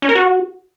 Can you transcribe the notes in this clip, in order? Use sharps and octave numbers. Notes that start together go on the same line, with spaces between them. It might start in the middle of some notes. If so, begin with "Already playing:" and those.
C#4
A#4
F#4